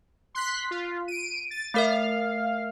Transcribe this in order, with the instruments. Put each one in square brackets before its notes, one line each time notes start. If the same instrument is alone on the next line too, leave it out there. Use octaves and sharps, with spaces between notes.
[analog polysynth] C6 F#6 B6
F4
D7 D#7
A6
[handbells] A3 A#4 E5 [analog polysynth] F5